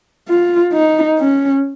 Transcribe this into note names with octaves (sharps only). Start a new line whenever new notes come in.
F4
D#4
C#4